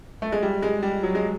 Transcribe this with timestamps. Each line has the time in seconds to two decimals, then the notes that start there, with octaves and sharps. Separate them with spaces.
0.22 A3
0.32 G#3
0.43 G3
0.62 G#3
0.83 G3
1.03 F#3
1.15 G#3